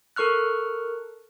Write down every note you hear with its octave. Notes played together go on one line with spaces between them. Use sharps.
A4 A#4 C#6 F6 F#6